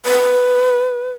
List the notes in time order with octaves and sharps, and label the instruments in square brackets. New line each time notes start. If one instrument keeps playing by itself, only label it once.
[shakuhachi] B4